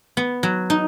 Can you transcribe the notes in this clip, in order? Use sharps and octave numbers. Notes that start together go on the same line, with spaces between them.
B3
F#3
D#4